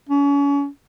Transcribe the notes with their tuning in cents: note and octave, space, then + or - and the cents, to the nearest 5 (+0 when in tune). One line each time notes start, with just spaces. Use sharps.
C#4 +35